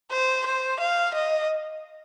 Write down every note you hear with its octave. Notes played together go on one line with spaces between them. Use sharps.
C5
C5
F5
D#5